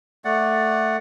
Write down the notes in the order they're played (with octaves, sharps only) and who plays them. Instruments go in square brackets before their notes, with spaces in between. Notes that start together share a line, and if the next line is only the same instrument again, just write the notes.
[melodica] A3 D5 F#5